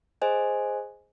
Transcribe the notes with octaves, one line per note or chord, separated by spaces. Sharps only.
G#4 C5 D#5 G#5